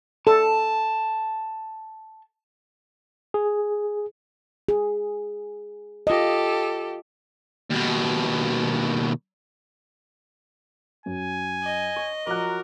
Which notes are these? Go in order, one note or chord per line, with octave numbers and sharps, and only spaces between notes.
A4 A5
G#4
G#4
F4 G4 A4 D#5
D#2 B2
F#2 G#5
D#5
C#5
F3 F#3 A#4 D5 F#6